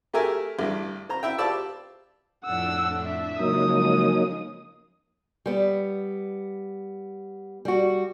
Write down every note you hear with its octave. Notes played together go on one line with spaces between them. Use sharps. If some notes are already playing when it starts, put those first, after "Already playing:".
A3 G4 G#4 A#4 E5 G#5
A1 G2
C5 A#5
E4 E5 G5
F4 G4 C5 D5 A5 E6
F2 A2 D4 F#5 E6
E5
C#3 F3 F#3 G#3 A#3 D#4 D#6
G3 B3
G3 F#4